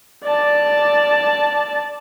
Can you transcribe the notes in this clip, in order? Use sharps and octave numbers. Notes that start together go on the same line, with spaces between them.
D5 A5